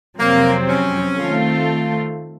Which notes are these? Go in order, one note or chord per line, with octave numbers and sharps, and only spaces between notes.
F2 C3 F#3 A#3 C4
C#4
D#3 A3 C4 F4 A4